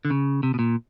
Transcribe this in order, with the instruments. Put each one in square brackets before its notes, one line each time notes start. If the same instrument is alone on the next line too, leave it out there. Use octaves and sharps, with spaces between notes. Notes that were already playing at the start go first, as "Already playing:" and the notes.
[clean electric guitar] D3
C#3
C3
B2
A#2